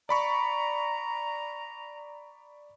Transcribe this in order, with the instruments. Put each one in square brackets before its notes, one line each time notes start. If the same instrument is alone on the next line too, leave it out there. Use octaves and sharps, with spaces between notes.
[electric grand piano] D5 B5 C#6 [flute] A#5